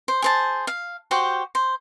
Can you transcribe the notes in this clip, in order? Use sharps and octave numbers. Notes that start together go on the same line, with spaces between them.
C5
G#4 C5 A5
F5
F#4 G4 C5
C5